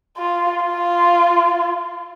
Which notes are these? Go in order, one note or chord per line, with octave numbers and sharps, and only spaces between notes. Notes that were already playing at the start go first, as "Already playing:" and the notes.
F4
F4